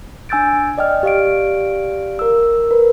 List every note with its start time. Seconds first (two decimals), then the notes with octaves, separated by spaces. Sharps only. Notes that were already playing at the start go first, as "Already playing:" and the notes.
0.29 D4 G#5 E6 G6 A6 D7
0.78 D5 D#5 G5 F6
1.03 G4 D5 F5 F6 D7
2.19 A#4 E6
2.71 A#4 B4